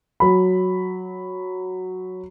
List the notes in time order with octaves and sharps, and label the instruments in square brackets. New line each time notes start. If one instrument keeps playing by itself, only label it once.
[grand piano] F#3 B5